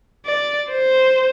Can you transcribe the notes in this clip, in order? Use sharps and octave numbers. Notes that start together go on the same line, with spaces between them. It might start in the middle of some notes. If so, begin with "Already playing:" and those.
D5
C5